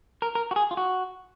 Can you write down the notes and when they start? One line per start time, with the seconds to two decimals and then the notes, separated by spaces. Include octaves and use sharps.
0.22 A#4
0.35 A#4
0.51 F#4
0.56 G#4
0.71 F4
0.77 F#4